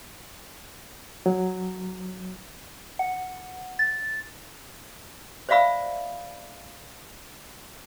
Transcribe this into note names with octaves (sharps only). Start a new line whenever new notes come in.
F#3
F#5
A6
C5 D5 E5 F5 B5 E6